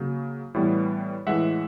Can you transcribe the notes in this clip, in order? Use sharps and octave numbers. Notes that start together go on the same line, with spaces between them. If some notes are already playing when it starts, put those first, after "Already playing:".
Already playing: C#3 F#3 A#3
A2 E3 G3 B3
A2 E3 G#3 E5 F#5